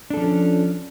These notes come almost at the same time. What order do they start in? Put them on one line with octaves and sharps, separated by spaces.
D4 A4 F3 C#4